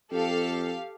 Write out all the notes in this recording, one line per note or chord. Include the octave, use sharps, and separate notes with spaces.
F2 G4 A4 F5